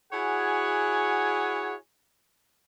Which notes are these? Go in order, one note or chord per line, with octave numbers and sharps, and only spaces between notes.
E4 F#4 G#4 C#5 F#5 G#5